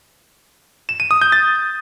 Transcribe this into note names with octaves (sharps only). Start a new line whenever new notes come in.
E7
D#7
D#6
G6
A6